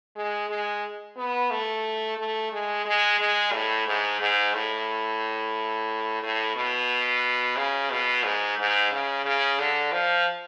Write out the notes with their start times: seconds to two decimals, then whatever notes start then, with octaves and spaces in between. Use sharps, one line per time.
0.16 G#3
0.49 G#3
1.17 B3
1.51 A3
2.18 A3
2.52 G#3
2.85 G#3
3.19 G#3
3.53 A2
3.87 G#2
4.20 G#2
4.54 A2
6.22 A2
6.55 B2
7.56 C#3
7.91 B2
8.24 G#2
8.58 G#2
8.91 C#3
9.25 C#3
9.59 D3
9.92 F3